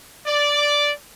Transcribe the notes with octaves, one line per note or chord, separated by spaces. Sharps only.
D5